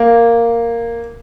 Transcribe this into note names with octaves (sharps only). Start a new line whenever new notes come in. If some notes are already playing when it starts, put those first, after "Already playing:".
Already playing: A#3